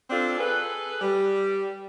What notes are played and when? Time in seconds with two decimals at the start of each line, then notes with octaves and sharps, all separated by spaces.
0.10 C4 D4 F4 A4
0.38 G#4 A4 B4
1.00 G3